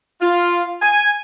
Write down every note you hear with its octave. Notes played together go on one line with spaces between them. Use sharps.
F4
G#5